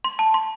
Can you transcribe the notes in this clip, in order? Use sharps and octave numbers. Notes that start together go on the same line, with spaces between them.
C6
A5
C6